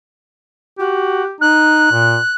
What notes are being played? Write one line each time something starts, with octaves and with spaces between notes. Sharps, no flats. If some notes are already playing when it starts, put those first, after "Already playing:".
F#4 G4
D#4 F#6
A#2